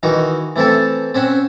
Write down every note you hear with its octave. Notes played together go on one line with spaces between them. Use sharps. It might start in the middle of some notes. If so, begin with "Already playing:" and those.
D#3 E3 D#4 F#4
E3 A3 C4 E4 A4
C4 C#4 E5 F#5